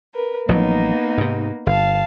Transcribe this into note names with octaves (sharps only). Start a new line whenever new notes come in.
A#4 B4
A1 F3 F#3 A#3 B3 D#4
G#2 C3
G1 F5 A5